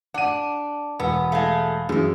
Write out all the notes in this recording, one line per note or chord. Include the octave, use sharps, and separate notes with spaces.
D4 F#5 D#7
E1 B3
G#3 A3 F5
F#2 D#3 E3 G#4